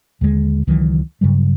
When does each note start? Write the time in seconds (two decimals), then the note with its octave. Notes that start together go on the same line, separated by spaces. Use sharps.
0.21 D#2 D3 F#3 G#3
0.67 C#2 D#3 E3 F#3
1.21 G2 C#3 F#3 G3